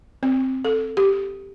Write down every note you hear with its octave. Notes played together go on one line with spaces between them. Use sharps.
C4
A4
G4